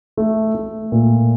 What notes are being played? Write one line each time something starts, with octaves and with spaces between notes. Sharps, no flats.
A3
A3
A#2